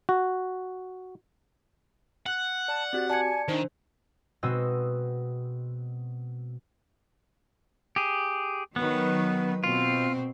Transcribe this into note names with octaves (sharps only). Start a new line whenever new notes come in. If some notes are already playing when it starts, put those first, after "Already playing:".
F#4
F#5 F#6 F#7
D5 A5
C4 F#4 G4 D5
D5 G#5 A5 G#6 C#7
D#3 D4 D#4 C5
B2 G#3 C4 F#4 D#5 E6
G4 G#4
D#3 F#3 B3 B4
B2 C4 F4